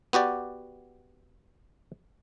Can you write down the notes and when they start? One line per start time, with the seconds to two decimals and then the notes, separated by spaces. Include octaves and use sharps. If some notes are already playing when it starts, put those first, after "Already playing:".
0.13 B3 F#4 G4 D5